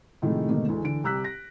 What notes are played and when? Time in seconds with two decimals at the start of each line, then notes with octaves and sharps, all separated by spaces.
0.22 A2 C3 D#3 F3 G#3 A3
0.49 G#2 B2 D3 D#3 A3 A#3
0.68 D2 E3 G#3 A3
0.84 D3 E3 D7
1.04 C2 G4 A#5 E6 F#6 B6
1.24 A#6